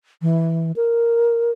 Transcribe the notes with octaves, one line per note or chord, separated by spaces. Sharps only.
E3
A#4